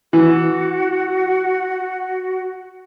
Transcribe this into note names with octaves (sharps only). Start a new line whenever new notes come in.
E3 F#4